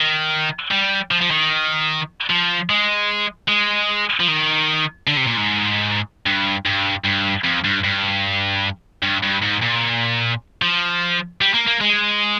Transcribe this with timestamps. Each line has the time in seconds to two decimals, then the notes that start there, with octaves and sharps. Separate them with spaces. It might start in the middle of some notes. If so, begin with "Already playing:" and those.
Already playing: D#3
0.71 G3
1.11 F3
1.21 F3
1.31 D#3
2.30 F3
2.70 G#3
3.48 G#3
4.20 F3
4.28 D#3
5.07 D3
5.17 C3
5.27 A#2
5.37 G#2
6.26 G2
6.66 G2
7.05 G2
7.44 F2
7.64 G2
7.84 G2
9.03 G2
9.23 G2
9.43 G#2
9.62 A#2
10.62 F3
11.41 G3
11.54 A#3
11.67 A#3
11.81 G#3